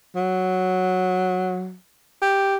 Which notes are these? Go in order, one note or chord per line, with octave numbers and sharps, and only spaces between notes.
F#3
G4